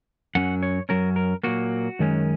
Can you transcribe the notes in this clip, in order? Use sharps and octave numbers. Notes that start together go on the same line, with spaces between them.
F#2 F#3 C#4 F#5
C#5
F#2 F#3 C#4 A#4
A#4
A#2 F#3 A#3 F#4
F#2 D#3 G#3 C#4